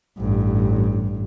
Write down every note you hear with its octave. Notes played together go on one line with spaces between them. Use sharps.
A1 G2